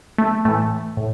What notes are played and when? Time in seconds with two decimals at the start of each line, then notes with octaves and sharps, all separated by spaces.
0.18 A3
0.45 A2 E3 A3
0.97 A2